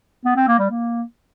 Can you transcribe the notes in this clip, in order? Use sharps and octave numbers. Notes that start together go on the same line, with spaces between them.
B3
C4
A#3
G3
A#3